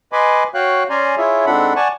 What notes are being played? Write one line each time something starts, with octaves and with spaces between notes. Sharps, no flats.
B4 D#5 G#5 B5 C6 D6
F#4 C#5 F5 G5 F#6
C#4 D5 G#5 A#5 C6
E4 F4 G#4 C#5 E5
G#2 C4 D4 A4 F#5 B5
D5 F#5 G#5 A5 C#6